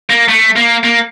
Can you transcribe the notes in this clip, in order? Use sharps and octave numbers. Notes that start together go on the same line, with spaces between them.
A#3
A3
A#3
A#3